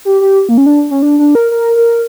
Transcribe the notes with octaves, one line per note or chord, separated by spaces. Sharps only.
G4
G4
A#3
C#4
D4
C#4
D4
D4
A#4
A#4
A#4